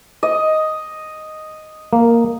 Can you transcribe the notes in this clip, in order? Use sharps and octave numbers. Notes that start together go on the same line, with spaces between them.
D#5
A#3